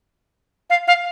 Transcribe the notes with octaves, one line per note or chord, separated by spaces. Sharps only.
F5
F5